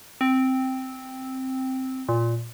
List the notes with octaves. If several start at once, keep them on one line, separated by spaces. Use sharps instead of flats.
C4
A#2